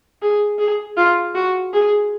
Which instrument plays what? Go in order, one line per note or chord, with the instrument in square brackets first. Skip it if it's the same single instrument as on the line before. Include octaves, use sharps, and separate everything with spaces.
[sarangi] G#4
G#4
F4
F#4
G#4